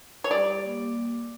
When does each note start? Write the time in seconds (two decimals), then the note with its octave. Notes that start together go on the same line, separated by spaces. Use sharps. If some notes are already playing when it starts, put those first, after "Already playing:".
0.24 C#5
0.31 G3 D5
0.63 A#3